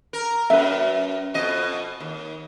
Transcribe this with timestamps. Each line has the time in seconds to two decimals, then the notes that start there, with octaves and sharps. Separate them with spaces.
0.13 A#4
0.50 F#2 B4 E5
1.34 F2 B2 D#5
2.00 D#2